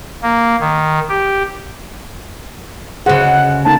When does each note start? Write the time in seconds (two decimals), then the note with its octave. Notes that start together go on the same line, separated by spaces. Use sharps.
0.22 A#3
0.60 D#3
1.09 G4
3.06 D2 C#3 G#4 C5 D#5 F#5
3.65 D3 A#3 D#4 A5